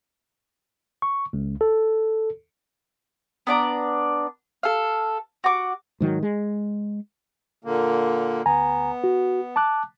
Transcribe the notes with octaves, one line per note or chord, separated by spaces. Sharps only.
C#6
C#2
A4
B3 D4 D5 A#5
A4 F5
F#4 D6
G#2 D#3 F#3
G#3
A#2 D3 A#3
D2 B3 G#5 A#5
F#4
A5 D6 F#6